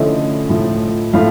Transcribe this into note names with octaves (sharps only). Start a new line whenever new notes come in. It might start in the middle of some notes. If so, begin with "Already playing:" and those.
Already playing: D3 F3 A3 C#4 E4 D#5
A2 F3 A3
A2 F3 A3 F5